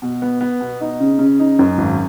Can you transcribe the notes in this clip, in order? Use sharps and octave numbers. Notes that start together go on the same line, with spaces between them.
B2
B3
B3
B2
D#4
C#3
C#3
D#4
F#2
G#1